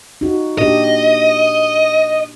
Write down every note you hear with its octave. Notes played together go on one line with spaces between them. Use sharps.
D#4 F#4
A#2 D4 G4 D#5